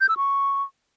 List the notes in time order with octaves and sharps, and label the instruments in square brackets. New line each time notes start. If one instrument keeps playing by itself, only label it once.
[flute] G6
E6
C#6